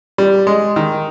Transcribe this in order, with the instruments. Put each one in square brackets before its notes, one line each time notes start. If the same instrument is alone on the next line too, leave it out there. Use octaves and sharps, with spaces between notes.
[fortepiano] G3
G#3
D#3